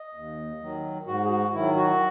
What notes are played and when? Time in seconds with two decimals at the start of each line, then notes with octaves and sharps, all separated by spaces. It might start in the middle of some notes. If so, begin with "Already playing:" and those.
Already playing: D#5
0.14 D#2
0.61 D#3 F#3
1.07 G#2 F#4
1.24 G#4
1.30 F#4
1.53 D#3 F#3 E4
1.76 F#4